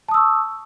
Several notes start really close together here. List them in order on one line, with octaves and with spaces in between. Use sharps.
A5 D#6 E6 C#6